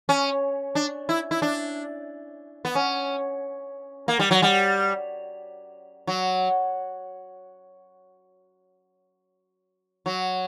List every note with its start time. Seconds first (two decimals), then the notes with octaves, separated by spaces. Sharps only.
0.09 C#4
0.75 D4
1.09 E4
1.31 E4
1.42 D4
2.65 B3
2.75 C#4
4.08 A#3
4.19 G3
4.31 F#3
4.42 G3
6.07 F#3
10.06 F#3